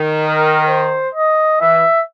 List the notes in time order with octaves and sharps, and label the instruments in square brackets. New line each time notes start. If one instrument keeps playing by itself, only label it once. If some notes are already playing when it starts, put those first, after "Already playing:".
Already playing: [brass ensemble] D#3
[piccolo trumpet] A#4
C5
D#5
[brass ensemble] E3 [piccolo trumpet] E5